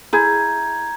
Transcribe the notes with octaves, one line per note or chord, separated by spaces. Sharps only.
E4 G#4 A#5 G6 G#6